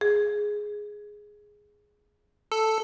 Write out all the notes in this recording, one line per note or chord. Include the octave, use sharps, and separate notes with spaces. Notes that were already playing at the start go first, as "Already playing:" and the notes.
G#4
A4